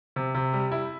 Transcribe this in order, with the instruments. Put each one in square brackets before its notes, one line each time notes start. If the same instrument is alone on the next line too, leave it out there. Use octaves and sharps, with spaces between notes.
[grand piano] C3
C3
G3
E4